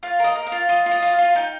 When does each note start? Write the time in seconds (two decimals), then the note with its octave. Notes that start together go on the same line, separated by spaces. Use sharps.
0.03 F4 F5
0.19 A#4 D#5
0.36 A#4
0.47 F5
0.52 F4
0.69 F4 D#5
0.86 F4
0.91 D#5
1.02 F4
1.13 F5
1.18 F4
1.35 D#4 G5